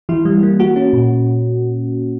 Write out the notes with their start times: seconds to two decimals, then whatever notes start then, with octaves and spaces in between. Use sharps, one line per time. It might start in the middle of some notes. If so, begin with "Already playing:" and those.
0.09 E3 E4
0.25 G3
0.43 A#3
0.59 A#3 F#4
0.76 C#4
0.93 A#2